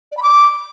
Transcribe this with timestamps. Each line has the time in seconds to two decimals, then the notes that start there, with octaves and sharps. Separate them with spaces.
0.12 D5
0.17 B5
0.23 D6